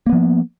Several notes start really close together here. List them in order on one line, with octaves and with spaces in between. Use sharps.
A#3 B3 F3